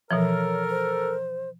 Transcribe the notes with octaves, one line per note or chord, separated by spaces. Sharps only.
B2 E3 F3 A4 A#4 C#5
C5